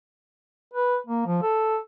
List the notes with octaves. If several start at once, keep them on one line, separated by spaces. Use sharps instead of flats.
B4
A#3
F3
A4